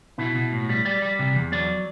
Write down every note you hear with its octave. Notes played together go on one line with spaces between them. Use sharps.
B2 E4
B2
A2
G3
G3 D5
G3
C3
E2
F#3 D5